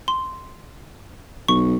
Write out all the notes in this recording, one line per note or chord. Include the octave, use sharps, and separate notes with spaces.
C6
B1 C#6